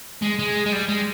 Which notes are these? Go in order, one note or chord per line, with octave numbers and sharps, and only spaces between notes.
G#3
G#3
G#3
G3
G#3